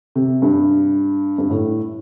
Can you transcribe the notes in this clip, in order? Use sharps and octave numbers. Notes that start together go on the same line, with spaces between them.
C3
G2
G2
A2